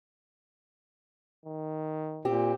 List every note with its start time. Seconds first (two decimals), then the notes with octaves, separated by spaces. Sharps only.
1.45 D#3
2.25 A#2 C4 G4